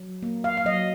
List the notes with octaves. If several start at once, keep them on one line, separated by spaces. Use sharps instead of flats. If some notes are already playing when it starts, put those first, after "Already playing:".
Already playing: F#3
A#3
F5
F5
F#3 D#5